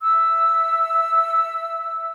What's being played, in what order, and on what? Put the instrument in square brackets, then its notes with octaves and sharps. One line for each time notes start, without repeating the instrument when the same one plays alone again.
[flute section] E5 E6